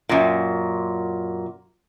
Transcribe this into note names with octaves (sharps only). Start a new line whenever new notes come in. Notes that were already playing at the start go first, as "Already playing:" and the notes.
F#2 A#2